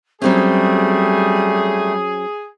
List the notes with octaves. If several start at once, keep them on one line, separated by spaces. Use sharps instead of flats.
F#3 G3 A3 C4 C#4 G#4